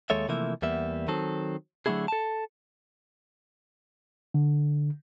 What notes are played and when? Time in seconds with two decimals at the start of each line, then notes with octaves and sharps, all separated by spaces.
0.10 D#2 G#3 A4 C#5 E5
0.28 C3 E3 F3 A3 A#3 E5
0.62 E2 G3 A#3 B3 E5
1.08 D#3 F#3 C4 A4
1.86 D3 F#3 A3 D4 E4 G#4
2.08 A4 A5
4.34 D3